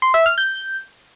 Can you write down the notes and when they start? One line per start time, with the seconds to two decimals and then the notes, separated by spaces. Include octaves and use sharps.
0.02 C6
0.14 E5
0.26 F6
0.38 G6